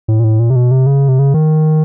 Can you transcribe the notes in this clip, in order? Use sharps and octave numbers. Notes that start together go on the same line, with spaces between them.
A2
A#2
A2
A#2
C3
B2
C3
C#3
C3
C#3
D#3